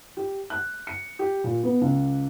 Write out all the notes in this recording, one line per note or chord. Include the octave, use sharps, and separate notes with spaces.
G4
F#6
C#7
G4
A#2
B3
C#2